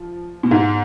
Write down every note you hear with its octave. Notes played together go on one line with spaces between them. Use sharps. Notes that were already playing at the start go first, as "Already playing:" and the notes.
Already playing: F3
B2
G#2